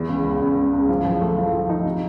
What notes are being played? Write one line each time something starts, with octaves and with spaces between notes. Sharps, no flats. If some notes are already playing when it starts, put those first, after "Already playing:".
Already playing: E2 E3
C#2
C#2
C#2
C#2
C#2
F3
F3
A3
F3
F3
D#4
C3